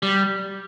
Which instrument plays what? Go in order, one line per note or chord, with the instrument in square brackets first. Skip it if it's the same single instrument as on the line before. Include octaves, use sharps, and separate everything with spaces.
[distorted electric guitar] G3